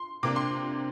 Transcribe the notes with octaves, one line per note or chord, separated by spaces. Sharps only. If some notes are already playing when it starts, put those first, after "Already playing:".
Already playing: C6
C3 A#3 D4 D6
C6